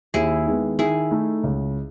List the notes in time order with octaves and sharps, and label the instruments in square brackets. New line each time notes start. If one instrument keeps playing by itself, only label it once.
[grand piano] D#2 [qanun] E4 G#4
[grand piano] D#3 G#3 B3
[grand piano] D#3 [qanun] E4 G#4
[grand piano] A3 D#4 A4
C#2